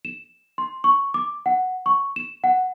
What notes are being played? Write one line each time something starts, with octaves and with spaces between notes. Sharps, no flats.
E7
C6
C#6
D6
F#5
C#6
E7
F#5